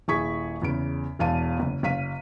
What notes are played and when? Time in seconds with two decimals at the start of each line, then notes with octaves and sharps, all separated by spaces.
0.08 D#1 E4 G#4 C#6 G#6 B6
0.62 E2 C#3 D7
1.19 E1 E2 F5 A5 D#7
1.60 F#1
1.83 F#1 F5 B6 D#7